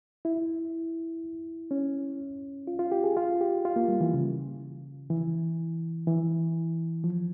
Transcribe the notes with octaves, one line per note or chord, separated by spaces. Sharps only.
E4
C#4
F4
F4
G4
G#4
F4
G4
F4
A#3
G3
E3
C#3
E3
E3
F3